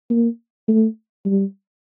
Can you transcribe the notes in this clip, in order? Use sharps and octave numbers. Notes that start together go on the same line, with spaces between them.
A#3
A3
G3